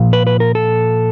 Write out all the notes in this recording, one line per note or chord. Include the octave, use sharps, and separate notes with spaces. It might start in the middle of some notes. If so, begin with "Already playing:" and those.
Already playing: A#2 F3
B4
B4
A#4
A4